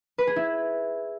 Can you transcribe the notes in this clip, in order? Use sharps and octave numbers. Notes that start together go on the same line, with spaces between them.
B4
G#4
E4